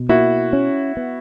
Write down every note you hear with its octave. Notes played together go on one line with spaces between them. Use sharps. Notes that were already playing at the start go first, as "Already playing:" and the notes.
Already playing: B2
A#3 E4 F#4
C#4
B3